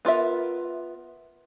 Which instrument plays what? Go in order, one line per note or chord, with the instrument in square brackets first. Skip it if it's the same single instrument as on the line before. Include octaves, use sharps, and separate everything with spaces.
[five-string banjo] B3 F4 A#4 E5